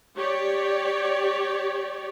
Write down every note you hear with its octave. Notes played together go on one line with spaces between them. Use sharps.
G4 C#5 D5